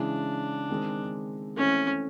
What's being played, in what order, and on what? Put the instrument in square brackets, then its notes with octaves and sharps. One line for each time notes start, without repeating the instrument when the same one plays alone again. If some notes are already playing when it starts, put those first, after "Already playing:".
Already playing: [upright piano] C#3 E3 G#3 [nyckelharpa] D4
[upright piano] D#3 G#3 C4
[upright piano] E3 A3 C4 [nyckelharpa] C#4